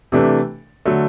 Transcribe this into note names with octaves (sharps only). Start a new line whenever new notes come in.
C3 E3 A3 D4
D3 F#3 A3